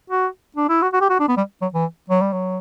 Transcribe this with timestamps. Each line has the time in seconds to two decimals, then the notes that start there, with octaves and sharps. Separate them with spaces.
0.10 F#4
0.56 D4
0.69 E4
0.82 F#4
0.93 F#4
1.01 G4
1.10 F#4
1.19 D4
1.28 B3
1.37 G3
1.62 F#3
1.74 E3
2.10 F#3
2.21 G3
2.32 F#3